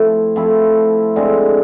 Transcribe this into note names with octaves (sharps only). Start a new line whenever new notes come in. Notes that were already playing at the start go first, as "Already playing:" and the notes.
Already playing: F3 A3 C4 E4
F3 A3 C4 E4
D3 G#3 C4